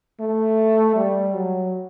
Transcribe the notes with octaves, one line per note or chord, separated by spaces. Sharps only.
A3
G3
F#3